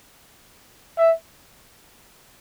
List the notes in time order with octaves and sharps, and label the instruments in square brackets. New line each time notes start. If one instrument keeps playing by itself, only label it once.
[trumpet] E5